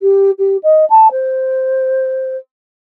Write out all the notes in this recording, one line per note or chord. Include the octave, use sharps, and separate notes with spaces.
G4
G4
D#5
A5
C5